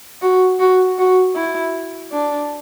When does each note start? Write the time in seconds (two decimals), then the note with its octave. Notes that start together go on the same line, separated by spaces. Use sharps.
0.22 F#4
0.60 F#4
0.98 F#4
1.35 E4
2.12 D4